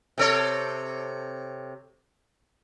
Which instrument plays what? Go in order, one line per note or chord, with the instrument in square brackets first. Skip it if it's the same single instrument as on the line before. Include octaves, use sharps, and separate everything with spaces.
[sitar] C3 A4 C#5